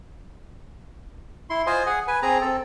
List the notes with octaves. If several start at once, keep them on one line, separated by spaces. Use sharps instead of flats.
E4 C6
F4 C5 D#5 G#5
G#4 F#5 G#5
B4 G#5
C4 G#4 A#5
C4 A4